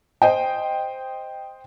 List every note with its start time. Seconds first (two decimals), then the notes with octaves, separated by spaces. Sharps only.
0.22 C5 D#5 G5